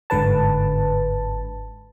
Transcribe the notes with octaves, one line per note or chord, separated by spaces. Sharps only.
G1 G#2 D3 B4 A5